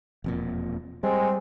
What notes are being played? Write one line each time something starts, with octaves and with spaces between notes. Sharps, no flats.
E1 F2 A#2
G3 G#3 C4